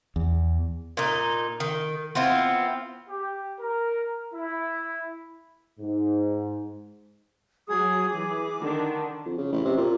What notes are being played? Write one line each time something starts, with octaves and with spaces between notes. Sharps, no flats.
E2
A#2 D#4
D#3
B3 C4 E4 F4
G4
A#4
E4
G#2
F#3 G#4 D#6
E3 G#4 D6
D3 D#3 D4
F2
C#3
A1
C3
A#2